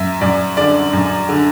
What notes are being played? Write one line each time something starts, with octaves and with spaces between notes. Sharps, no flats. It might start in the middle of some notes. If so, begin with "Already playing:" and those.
Already playing: F#2 E5
F#2 D5
D3 D5
F#2
D3